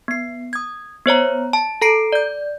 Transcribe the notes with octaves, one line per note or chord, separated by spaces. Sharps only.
B3 C7
D#6 G#6
B3 C5 C#5 A#5
A5
A4 A#5 C7 D7
D5 G6